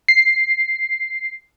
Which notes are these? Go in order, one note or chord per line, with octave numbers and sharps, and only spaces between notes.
C7